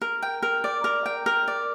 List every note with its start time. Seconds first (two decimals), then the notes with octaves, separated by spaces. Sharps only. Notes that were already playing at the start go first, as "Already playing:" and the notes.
0.02 A#4
0.22 G5
0.43 A#4
0.64 D5
0.84 A#4
1.06 G5
1.26 A#4
1.48 D5